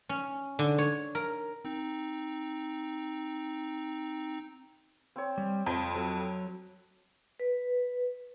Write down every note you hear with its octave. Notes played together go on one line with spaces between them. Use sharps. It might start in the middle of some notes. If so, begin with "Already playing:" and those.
C#4
D3
C#5
A#4
C4 D#4
C4 C#5
G3
F2 C5
F#3 A4
B4